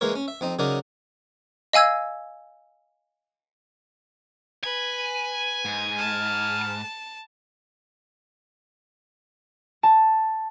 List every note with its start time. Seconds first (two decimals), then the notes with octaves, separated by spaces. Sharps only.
0.01 E3 G#3 A#3 A#4 C#5
0.15 C#4
0.28 E5
0.41 F2 C4 D#4
0.59 C#3 F#3 D#4 A#4 D5
1.73 D#5 F5 G#5 E6 G#6
4.64 B4 G#5
5.65 G#2
5.98 A5 F6
9.83 A5